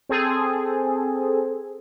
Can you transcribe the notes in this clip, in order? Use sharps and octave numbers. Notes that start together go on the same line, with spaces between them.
C4 G#4 A4